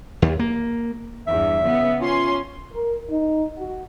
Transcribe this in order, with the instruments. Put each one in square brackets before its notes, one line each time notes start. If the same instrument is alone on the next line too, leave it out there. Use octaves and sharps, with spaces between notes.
[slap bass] D#2
A#3
[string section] E2 G2 [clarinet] E5
[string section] C#3 B3
[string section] C#4 C6 [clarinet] F4
[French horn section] A#4
D#4
F#4